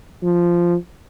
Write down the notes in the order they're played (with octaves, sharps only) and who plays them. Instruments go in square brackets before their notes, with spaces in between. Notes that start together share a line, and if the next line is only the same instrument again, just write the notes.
[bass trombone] F3